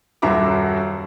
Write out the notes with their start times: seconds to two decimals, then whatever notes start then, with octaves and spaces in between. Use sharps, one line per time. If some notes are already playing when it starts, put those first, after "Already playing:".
0.22 D#1 F#2 F#4 E5 A#5 D6